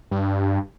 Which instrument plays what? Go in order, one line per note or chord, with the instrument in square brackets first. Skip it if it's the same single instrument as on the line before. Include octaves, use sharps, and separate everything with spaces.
[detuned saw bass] G2